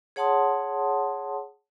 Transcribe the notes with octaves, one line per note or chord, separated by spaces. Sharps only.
G#4 C#5 F#5 A5 C6 D#6